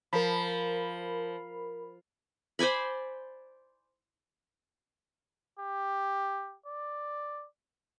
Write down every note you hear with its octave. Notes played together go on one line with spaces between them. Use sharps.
F3 A#4 B5
C5 D5 G#5 B5
G4
D5